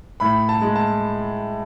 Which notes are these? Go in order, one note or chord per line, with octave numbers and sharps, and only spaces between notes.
A2 B5
A5
G#3
A5